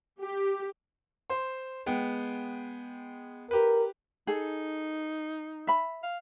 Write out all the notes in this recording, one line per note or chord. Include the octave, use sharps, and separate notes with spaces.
G4
C5 C6
G#3 B3 G5
G4 A#4 B4
D#4 G#4 A4
E5 B5
F5